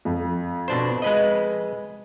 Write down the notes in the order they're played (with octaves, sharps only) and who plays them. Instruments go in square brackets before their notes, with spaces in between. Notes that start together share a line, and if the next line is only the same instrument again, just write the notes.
[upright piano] F2
[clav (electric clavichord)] B2 D4 C5
G#3 B4 D#5